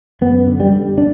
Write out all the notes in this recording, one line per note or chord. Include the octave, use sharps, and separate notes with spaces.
F#2 B3
D3
G3
D3
D4